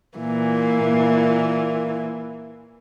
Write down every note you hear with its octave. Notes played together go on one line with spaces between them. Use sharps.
A#2 E3 A#3